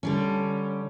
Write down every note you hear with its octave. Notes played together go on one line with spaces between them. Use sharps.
D3 G3 C#4